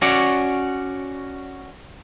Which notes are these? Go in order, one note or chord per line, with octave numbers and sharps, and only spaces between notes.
C#4 F#4 C#5 D5